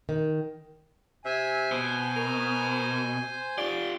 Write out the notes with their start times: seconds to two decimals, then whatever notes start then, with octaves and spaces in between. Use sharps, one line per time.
0.09 D#3
1.25 C3 E5 G#5
1.72 B2 C5
2.17 A#4
3.58 F4 G4 D5